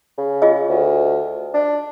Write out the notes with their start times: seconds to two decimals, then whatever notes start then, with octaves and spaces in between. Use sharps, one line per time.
0.18 C#3
0.42 F4 G#4 D#5
0.69 D2
1.54 D4